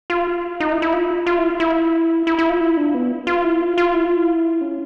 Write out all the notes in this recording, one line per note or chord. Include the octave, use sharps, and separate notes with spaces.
F4
D#4
E4
E4
F4
F4
E4
E4
E4
E4
F4
E4
D4
B3
F4
E4
F4
F4
E4
F4
E4
C#4